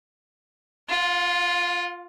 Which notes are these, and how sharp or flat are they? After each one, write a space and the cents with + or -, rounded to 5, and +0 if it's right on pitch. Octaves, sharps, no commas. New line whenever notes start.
F4 +0 F5 +40